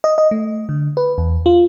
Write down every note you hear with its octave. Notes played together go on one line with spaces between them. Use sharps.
D#5
D#5
A3
D3
B4
E2
F4